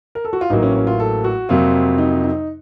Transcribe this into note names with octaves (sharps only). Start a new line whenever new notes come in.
A#4
A4
F#4
F4
A1 A2 F#3 A#3 D#4
C#4
C#4
F4
A4
F#4
F2 C3 F#3 A#3 F4
D#4
D#4